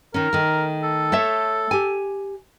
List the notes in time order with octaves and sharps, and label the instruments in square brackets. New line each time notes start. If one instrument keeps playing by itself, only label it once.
[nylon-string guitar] D#3 C#4 [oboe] A#4
[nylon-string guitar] D#3 A3
[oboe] A4
[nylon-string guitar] A3 C#5 E5
G4 G#5